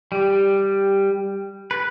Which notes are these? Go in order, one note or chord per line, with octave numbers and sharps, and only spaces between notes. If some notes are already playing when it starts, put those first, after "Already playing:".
G3
B4